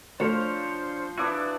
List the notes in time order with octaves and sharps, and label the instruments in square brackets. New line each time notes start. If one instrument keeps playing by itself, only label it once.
[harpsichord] D2 [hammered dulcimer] F3 [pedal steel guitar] D4 C#5 F5 [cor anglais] C5
[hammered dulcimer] E3 D4 E4 [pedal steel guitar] F#4 D5 D#6